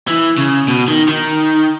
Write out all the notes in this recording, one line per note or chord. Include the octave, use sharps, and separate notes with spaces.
E3
C#3
B2
D#3
D#3